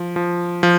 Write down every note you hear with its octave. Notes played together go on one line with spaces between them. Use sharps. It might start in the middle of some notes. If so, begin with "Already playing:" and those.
Already playing: F3
F3
F3